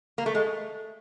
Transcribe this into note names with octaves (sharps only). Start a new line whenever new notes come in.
A#3
A3
G#3